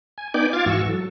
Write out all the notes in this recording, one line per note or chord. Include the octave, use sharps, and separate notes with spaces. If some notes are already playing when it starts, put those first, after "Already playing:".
G#5
B3 D#4 D5 G5 G#5 D6
F4 F5 D6 G#6 A6
G#2 E3 F#4 C#6 E6
F#3 A4